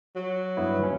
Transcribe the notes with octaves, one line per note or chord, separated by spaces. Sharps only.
F#3
G2 B3 E4
D#2 C#4